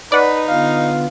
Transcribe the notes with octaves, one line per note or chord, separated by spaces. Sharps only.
D#4 B4 D5 F#5
D3 B3 F4 F5